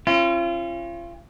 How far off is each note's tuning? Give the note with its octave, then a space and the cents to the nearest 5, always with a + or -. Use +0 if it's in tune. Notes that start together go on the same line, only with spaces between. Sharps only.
C#4 -45 F4 -35